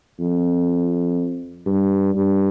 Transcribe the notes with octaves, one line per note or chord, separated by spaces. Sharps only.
F2
G2
G2